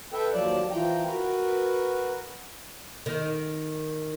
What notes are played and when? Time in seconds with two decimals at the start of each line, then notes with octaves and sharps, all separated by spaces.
0.13 A4 B4 E5 G5
0.32 D#2 F3 F#3 D5 A5
0.71 E3 F3 G5 A#5
1.06 F#4 A#4 B4
3.06 D#3